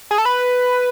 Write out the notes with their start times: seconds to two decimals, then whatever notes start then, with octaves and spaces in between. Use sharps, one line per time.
0.11 G#4
0.18 A4
0.25 B4